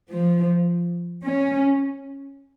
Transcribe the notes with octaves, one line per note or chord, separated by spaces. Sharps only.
F3
C#4